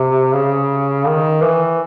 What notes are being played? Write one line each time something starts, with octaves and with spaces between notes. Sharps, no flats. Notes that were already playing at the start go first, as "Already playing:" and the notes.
Already playing: C3
C#3
D#3
E3